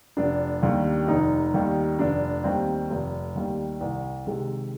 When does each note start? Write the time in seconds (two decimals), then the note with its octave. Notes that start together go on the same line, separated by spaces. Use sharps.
0.17 F1 D4
0.62 D#2 D#3 G3
1.08 F1 D#4
1.54 D#2 D#3 G3
1.99 F1 D4
2.44 D#2 D#3 G3 C4
2.90 F1
3.35 D#2 D#3 G3
3.81 C2
4.27 C3 D#3 G#3